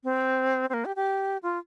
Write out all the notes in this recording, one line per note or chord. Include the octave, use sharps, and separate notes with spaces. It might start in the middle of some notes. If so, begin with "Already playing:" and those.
C4
C4
A#3
G4
G4
F4